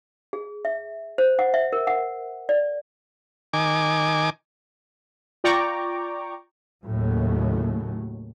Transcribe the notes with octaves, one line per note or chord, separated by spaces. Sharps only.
G#4
E5
C5
F#5
E5
A#4
F#5
D5
D#3 G#5 D6
F4 D5 G5 A#5 C#6 D6
D#2 A2 C#3 F#3 A3